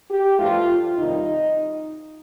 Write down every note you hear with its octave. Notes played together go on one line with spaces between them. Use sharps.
G4
G2 F3 A3 F4
F2 C3 D#3 G3 D#4